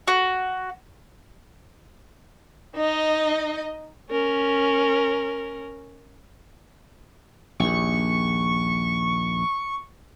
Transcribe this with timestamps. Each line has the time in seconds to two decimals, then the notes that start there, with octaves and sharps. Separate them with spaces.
0.07 F#4
2.75 D#4 D#5
4.10 C#4 A#4
7.60 A#1 D#2 C#6